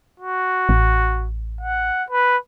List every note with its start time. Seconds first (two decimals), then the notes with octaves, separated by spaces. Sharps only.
0.20 F#4
0.69 A1
1.61 F#5
2.10 B4